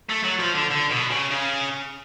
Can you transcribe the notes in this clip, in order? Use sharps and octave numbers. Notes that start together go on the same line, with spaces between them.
A3
F#3
F3
D3
D3
B2
C#3
C#3